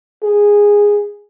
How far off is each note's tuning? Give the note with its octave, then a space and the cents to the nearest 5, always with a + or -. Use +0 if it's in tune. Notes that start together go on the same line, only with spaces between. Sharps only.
G#4 -10